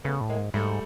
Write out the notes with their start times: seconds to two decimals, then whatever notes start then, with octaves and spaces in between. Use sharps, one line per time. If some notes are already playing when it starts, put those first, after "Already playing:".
0.04 C#3 A3 B3
0.21 A2
0.29 G#3 A#3
0.38 G#2
0.54 G#2 G3 A3